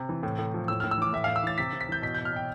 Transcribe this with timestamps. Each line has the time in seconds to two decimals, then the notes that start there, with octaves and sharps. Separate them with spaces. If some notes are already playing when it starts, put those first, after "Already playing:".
Already playing: C3
0.09 E3
0.23 A2
0.38 A2
0.54 F3
0.68 A2 E6
0.80 F6
0.84 A2
0.91 E6
0.98 E3 D6
1.13 A2 E5
1.24 F5
1.28 A2
1.36 E6
1.43 E3 A6
1.58 C3 B6
1.73 C3
1.81 B6
1.88 E3 G6
2.02 B2 B6
2.15 G6
2.18 B2
2.25 F6
2.33 B2 G5